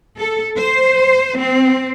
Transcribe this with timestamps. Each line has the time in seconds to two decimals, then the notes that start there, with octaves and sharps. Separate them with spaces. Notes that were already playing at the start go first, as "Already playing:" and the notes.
0.18 A4
0.56 C5
1.38 C4